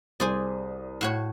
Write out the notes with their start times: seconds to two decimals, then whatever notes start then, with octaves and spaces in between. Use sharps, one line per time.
0.20 C2 G#4 C5 D5 D#6
1.01 A2 F#4 C#5